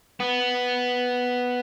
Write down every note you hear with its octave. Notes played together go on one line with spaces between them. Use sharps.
B3